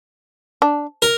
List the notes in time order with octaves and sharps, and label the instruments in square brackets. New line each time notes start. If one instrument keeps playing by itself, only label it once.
[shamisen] D4
[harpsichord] A#4